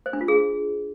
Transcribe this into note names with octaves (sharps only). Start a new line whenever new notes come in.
C5
D4
F4
G#4